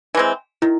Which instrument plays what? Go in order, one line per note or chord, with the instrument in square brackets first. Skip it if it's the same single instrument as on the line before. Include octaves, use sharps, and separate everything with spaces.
[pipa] E3 G#3 C4
[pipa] D#3 [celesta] E4